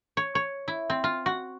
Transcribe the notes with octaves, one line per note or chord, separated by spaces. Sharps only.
C#5
C#5
E4
C4
F4
F#4